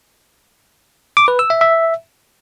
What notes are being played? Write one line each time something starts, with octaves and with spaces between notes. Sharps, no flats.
D6
B4
E6
E5
E5